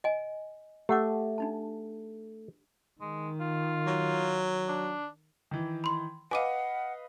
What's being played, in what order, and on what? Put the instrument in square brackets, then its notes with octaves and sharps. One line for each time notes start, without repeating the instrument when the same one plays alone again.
[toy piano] D#5 G#5
[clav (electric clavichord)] A3 [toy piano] G4 F#5 D6
[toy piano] D4 D#4 A5
[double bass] D#3 [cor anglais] G#3
[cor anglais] F4
[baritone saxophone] F#3
[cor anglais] D4
[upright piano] D#3 E3
[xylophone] B5 C6
[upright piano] B4 D#5 F5 [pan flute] F#5 [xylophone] G#5 D6 D#7